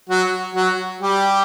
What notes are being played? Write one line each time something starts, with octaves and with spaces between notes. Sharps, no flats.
F#3 F#4
F#3 F#4
G3 G4